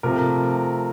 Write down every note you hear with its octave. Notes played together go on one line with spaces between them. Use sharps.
C3 F3 A3 A#4